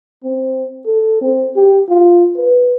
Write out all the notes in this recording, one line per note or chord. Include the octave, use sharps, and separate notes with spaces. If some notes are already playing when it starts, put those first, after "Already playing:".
C4
A4
C4
G4
F4
B4